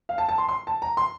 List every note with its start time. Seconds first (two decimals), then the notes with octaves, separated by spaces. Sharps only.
0.09 F5
0.18 A5
0.29 A5
0.38 C6
0.49 C6
0.67 A5
0.82 A#5
0.97 C6